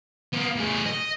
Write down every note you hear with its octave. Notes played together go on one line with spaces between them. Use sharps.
A#3 B3
A2 G#4
D#5